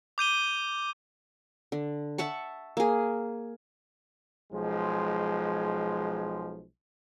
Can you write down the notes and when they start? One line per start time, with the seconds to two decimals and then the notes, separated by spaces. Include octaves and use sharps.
0.18 D6 G6 D#7 G7
1.72 D3
2.18 E5 F#5 A5 C#6
2.77 A#3 G#4
4.53 B1 F3 G#3